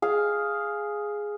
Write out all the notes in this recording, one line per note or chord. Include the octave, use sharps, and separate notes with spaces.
G#4 F5